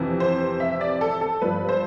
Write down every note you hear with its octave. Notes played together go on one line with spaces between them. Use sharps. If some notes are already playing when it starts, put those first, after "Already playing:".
Already playing: F2 C3 E3
C5
E5
D5
A4
A4
G2 F3 B4
C5